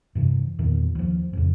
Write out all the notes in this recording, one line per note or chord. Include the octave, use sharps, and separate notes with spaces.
G2 C3 E3
E2 A#2 D#3
D#2 F3
F2 A2 C#3